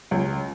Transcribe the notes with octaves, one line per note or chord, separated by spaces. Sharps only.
C#2